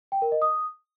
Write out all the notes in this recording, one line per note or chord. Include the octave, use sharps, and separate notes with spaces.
G5
A#4
D#5
D#6